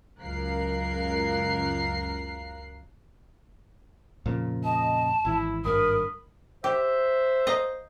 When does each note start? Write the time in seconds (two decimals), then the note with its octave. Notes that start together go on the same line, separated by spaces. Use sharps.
0.20 C#2 F#2 A#4 F5 F#6 C7
4.25 F2 A#2 C#3
4.64 D#5 A5
5.25 G#1 E3 E4
5.65 G#1 G2 A#4 B5 D#6
6.64 G4 C5 E5
7.47 D#5 F5 A#5